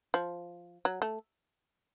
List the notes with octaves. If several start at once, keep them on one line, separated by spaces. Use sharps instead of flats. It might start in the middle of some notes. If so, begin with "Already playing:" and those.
F3
F#3
A3